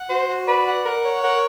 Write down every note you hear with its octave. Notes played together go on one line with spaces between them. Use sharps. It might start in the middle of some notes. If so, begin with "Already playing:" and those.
Already playing: F#5
F#4 C5
F#4
B4 D5
F#5
A#4 F#5
C#5
A#4 F#5